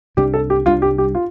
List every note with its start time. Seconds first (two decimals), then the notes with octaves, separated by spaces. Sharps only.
0.17 C2 C3 G3 D4 G4
0.34 A4
0.50 G4
0.66 C2 C3 G3 D4 F4
0.82 G4
0.98 G4
1.15 F4